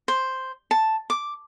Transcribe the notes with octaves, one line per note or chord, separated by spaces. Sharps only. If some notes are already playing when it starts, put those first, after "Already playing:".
C5
A5
D6